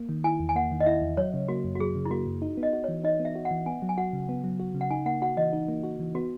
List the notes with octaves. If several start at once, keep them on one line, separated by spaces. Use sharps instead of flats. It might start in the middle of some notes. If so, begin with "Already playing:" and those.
Already playing: A#3
D#3
E4 G#5
E2
G#5
A#3 F#5
D#3
D#5
E4 E5
E2
F#3 C#5
C#3
A#3 F#4
F#2
F#4
F#3 G#4
C#3
E4
A#3 F#4
F#2
D#4
B3
D#5
F#4
C#5
E3
D#4 D#5
B3
E5
F#4
F#5
E3
B3 G#5
F#3
G#5
F#4 F#5
C#3
B3
F#3
F#4
C#3
F#5
D#4 G#5
A#3 F#5
F#4 F#5
E3 D#5
D#4
A#3
F#4
E3
B3 F#4